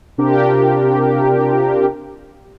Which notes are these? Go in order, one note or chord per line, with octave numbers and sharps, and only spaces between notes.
C3 D4 F4 G4 A#4